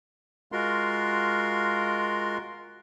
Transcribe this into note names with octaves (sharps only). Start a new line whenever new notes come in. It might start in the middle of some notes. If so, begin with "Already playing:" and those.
G#3 F4 F#4 A#4 C6